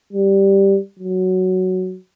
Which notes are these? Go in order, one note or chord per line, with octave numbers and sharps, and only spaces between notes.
G3
F#3